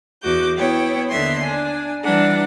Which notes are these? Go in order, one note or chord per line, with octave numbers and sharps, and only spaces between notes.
E2 F#4 D6 G6
B3 E4 C#5 G5
D#2 D3 B3 E5 C6
D4 G#5
E3 G3 D4 F#5 A#5